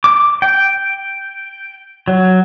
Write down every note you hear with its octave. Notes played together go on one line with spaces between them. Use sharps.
D6
G5
F#3